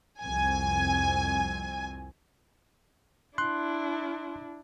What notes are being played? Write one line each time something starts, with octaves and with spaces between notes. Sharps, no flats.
C2 F2 C4 G#5
D4 E4 C6 F#6